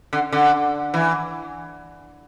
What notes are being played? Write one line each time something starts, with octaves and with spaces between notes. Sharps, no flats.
D3
D3
E3